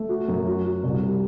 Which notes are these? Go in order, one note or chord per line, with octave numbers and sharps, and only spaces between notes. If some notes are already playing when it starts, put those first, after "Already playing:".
Already playing: A3
F#4
F#2
F#4
F#4
C2
G3